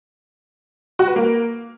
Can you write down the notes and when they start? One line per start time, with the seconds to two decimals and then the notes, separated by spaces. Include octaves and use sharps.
0.99 F#4
1.08 B4
1.16 A#3